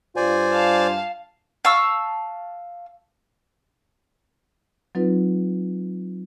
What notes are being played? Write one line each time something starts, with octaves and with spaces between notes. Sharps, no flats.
G2 F4 C5 D5 G#5
F5 A5
F5 A5 C#6 E6
F#3 C4 D#4 F4 B4